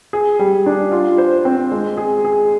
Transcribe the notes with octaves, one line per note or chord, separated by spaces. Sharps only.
G#4
G3
D4
F4
C5
C4
G#3
G#4
G#4